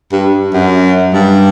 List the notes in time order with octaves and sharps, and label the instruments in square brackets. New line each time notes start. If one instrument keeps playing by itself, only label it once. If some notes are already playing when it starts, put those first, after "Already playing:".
[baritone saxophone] G2
F#2
G2